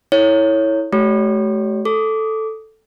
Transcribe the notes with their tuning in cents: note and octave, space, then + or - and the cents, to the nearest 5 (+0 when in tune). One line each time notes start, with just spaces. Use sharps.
E4 -20 A4 +0 C#5 +0
A3 -35 G4 -45 C#5 +15
A4 +0 D6 -15